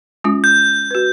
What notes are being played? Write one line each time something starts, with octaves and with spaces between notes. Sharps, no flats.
G#3 C#4 F4
G6
F#4 B4